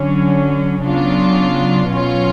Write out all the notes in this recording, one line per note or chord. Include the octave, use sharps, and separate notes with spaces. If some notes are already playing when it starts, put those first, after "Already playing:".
Already playing: D3 F#3 C#4
C#3 F#3 B3 D4 F4
B2 F#3 C#4 F4